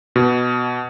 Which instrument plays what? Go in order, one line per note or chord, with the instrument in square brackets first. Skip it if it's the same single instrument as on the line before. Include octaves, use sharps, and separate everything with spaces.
[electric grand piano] B2